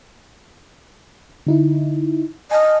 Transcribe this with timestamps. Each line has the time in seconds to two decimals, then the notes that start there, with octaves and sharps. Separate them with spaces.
1.47 D3 D#4 E4
2.51 D#5 G#5 A5 F6